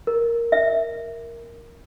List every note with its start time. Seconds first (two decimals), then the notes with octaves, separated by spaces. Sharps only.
0.07 A#4
0.52 E5